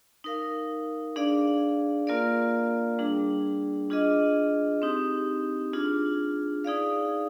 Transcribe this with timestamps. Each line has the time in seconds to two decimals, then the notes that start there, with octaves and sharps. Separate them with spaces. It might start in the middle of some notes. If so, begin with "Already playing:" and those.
0.24 D#4 A#4 F5
1.16 D4 G#4 D5 F5
2.07 A#3 F4 A#4 D5 F5
2.98 G3 D4 G#4
3.90 D4 F4 G#4 D#5
4.82 C4 D#4 G4
5.73 D4 F4 G#4
6.64 D#4 G#4 D5 F5